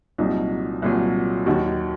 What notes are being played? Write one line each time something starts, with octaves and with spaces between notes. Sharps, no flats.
C2 A#2 F#3 D#4
C2 A#2 F#3
D#2 D#3 F#3 F#4